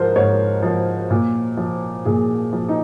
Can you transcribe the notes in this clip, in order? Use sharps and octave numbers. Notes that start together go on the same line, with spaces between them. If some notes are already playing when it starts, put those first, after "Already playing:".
Already playing: G#2 F3 A#4 C5
G#2 C#5
F3
A#2
F3
A#2 G#4
F3
D#4